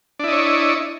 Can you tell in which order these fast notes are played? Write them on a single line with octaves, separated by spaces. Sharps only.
D4 E4 D#5 C#5